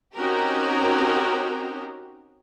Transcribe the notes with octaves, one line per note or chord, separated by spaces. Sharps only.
C4 C#4 D#4 F#4 G4 A#4